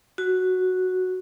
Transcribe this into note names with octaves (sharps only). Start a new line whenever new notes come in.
F#4